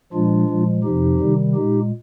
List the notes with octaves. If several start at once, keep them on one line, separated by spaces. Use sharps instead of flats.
A#2 F3 G#3 D4 F4
A#2 F3 G#3
F2 C3 F3 D#4 G4
C3 D#3 G3
A#2 G#3 D#4 G4